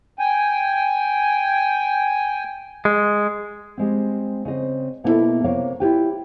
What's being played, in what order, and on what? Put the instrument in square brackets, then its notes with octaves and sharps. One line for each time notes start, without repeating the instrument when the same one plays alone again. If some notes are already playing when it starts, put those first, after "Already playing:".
[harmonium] G5 G#5
[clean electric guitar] G#3
[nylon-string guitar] G3 G#3 C4
C#3 C4 D#5
B2 A#3 B3 E4 F4 A4
C3 A#3 C#5 F5
E4 F4 G4 B4 G5